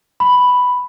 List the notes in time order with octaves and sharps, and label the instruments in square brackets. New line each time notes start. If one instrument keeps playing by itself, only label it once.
[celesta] B5